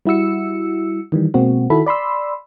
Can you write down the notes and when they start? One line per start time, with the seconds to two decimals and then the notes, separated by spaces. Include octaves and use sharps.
0.06 G3 E4 F#4 E6 C#7
1.12 D#3 E3 G3
1.34 B2 G#3 A#3 C4 F#4
1.70 D#3 E4 F#4 A4 B5
1.86 D5 B5 C6 E6